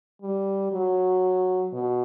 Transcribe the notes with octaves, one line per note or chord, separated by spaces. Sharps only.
G3
F#3
B2